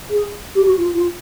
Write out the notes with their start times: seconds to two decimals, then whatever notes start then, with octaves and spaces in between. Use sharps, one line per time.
0.10 G#4
0.55 G4
0.66 F#4
0.77 F4
0.94 F4